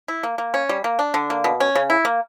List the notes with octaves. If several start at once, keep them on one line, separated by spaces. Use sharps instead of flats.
E4
A#3
A#3
C#4
G3
A#3
D4
D3
A#3
B2
C#4
C#3
E4
A#3